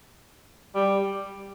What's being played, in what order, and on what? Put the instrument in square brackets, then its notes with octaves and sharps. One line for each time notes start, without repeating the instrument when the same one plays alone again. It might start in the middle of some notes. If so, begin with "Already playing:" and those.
[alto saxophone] G3